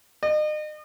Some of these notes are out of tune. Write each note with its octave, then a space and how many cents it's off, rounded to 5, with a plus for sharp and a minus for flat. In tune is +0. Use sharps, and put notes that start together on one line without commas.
D#5 -35